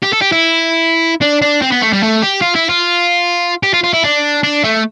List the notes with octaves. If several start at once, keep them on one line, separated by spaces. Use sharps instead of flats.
G4
A4
G4
E4
D4
D4
C4
B3
A3
G3
A3
G4
F4
E4
F4
G4
F4
F4
E4
D4
D4
A3